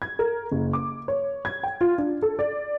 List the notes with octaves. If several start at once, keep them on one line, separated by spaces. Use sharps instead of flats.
G#6
A#4
F#1
D6
C#5
G#6
G5
F4
D4
A4
D5